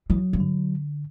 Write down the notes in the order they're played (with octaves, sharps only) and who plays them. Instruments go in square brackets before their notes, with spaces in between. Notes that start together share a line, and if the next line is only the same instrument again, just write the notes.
[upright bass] E3 [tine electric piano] F#3
[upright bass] G2
[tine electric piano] D3